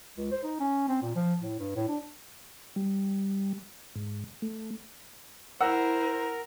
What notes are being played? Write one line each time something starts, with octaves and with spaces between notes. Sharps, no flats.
C#2
C5
D#4
C#4
C4
A#2
F3
A2
G2
A2
D4
G3
G#2
A3
E4 A#4 C5 F#5 E6